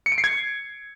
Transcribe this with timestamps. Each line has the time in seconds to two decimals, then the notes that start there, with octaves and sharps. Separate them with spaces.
0.06 C#7
0.12 D7
0.18 C7
0.24 G#6